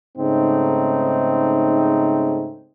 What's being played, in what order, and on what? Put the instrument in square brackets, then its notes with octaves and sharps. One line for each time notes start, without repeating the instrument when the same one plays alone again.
[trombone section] G#2 C#3 A3 C4 D#4